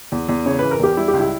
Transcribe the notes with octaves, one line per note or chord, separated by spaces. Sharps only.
E2
E2
C#3 C#5
E3 B4
A#4
E2 G4
G3 E4
G4
C#2
E4